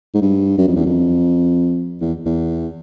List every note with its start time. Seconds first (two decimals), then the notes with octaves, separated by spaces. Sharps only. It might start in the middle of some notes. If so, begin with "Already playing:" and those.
0.14 G#2
0.22 G2
0.58 F#2
0.68 F2
0.76 E2
0.86 F2
2.01 E2
2.26 E2